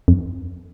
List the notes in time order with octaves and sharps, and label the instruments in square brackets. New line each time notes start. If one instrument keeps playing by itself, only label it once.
[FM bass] F2